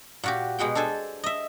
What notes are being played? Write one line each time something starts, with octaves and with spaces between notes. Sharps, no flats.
A#2 F#4 G4
B2 G#3 F#5 G5
D4 A4 C5 G#5
D#5 E5